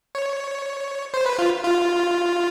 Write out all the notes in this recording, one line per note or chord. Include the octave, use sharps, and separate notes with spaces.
C#5
C5
B4
F4
F4